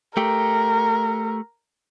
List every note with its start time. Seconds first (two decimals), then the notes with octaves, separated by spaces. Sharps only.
0.17 A3 G4 A#4